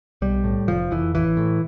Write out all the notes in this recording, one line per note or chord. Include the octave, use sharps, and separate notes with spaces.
B1 G3
A2
F1 F3
F2 E3
A1 E3
A2